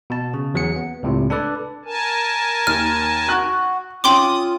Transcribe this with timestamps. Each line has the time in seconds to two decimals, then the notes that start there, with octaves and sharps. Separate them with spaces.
0.10 B2 A5
0.34 C#3
0.54 E2 F#3 G#4 C#7
0.76 B3
1.03 C#2 A2 C3
1.30 D4 A4 B4 D5
1.85 A#4 G#5 A5
2.67 D#2 F6
3.29 F#4 F#6
4.04 C#4 F4 G5 C6 D6 D#6 F#7